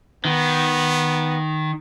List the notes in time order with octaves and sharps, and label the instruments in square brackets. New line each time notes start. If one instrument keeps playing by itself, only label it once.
[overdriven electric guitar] D#3 [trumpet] B3